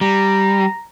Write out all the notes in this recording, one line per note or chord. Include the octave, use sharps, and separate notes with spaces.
G3 A#5